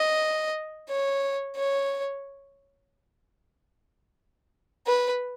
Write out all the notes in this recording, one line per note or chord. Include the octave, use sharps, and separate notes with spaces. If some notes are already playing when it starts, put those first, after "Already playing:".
Already playing: D#5
C#5
C#5
B4